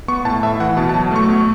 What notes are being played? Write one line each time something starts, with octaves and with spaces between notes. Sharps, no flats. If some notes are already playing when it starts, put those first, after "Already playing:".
B3 C#6
A2 A5
A2 E5
E3 F#5
B2 A5
A5
F#3
A3 C#6
B2